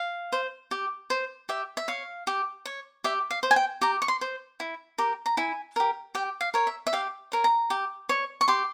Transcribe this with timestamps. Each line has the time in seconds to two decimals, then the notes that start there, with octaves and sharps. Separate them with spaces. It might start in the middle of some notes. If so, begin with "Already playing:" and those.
Already playing: F5
0.32 C5
0.71 G4
1.10 C5
1.49 G4 E5
1.77 E5
1.88 C#5 F5
2.27 G4
2.65 C#5
3.04 G4 E5
3.31 F5
3.43 C5
3.51 G#5
3.56 G5
3.82 G4 A#5
4.02 C#6
4.08 C6
4.21 C5
4.60 E4
4.98 G4 A#4
5.26 A#5
5.37 E4 G#5
5.76 G4 A#4
6.15 G4 G5
6.41 F5
6.54 A#4 C#5
6.67 E5
6.87 E5
6.93 G4 F5
7.32 A#4 C#5
7.44 A#5
7.70 G4
8.09 C#5
8.41 C#6
8.48 G4 C6